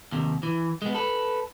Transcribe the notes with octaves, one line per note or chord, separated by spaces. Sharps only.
D#2 C3
E3
G#3 B3
A4 B4